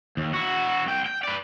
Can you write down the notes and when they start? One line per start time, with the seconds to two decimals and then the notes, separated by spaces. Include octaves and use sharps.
0.17 D#2
0.33 E4 F#4
0.86 C2 G5
1.06 G5
1.23 B4 D5